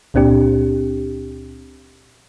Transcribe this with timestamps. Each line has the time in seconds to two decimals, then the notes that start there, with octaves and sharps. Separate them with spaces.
0.14 C#2 A#2 C4 D4 G4